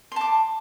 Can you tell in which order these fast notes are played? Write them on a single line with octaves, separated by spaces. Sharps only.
C6 A5 D6